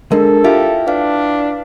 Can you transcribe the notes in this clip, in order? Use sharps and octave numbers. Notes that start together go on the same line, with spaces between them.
G#3 D4 A4 A#4
E4 F4 G4 E5
D4 B4 F5